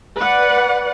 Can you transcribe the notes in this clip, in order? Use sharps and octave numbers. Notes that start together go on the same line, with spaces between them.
B4 D5 F#5